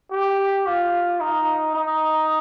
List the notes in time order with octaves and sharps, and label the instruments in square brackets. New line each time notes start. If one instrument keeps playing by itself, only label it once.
[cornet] G4
F4
D#4
D#4